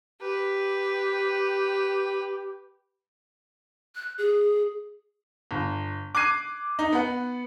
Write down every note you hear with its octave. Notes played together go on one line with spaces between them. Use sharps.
G4 B4
F#6
G#4
G1
D6 F#6 G#6 C7 D#7
D#4
B3 F#5